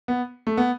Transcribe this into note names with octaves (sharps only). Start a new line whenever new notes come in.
B3
A3
B3